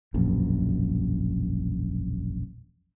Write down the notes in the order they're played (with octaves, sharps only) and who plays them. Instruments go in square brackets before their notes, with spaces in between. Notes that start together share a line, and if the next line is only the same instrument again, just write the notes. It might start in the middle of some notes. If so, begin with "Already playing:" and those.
[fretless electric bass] E1 A#1 F#2